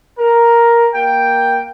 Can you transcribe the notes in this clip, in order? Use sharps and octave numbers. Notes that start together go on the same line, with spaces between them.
A#4
A#3 G5